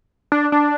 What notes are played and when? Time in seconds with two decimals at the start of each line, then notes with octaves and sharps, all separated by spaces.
0.32 D4
0.52 D4